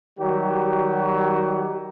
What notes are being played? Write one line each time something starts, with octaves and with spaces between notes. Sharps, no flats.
D#3 F#3 G3 F#4 G4